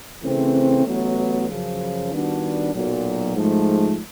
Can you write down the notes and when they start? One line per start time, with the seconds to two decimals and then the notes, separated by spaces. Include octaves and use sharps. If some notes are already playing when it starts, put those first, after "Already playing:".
0.24 C#3 E3 A3 C4
0.86 A1 A2 F#3 B3
1.48 F#2 C#3 F3
2.11 D#3 G3 B3 D4 F#4
2.74 B1 A#2 F#3
3.36 G#2 F3 A3